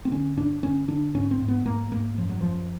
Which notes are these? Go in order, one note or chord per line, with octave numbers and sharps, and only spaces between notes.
C4
D3 C#4
G2 D4
D3 C#4
D3 D4
G#2 C#4
C4
G#2
B3
G#2 A#3
G#2 A#3
F#2 F3
F#3
F#2 F3